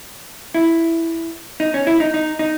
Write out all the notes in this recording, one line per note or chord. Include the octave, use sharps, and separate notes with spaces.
E4
D#4
C#4
E4
D#4
D#4
D#4